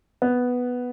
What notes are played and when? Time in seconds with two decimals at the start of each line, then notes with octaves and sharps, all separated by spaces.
0.22 B3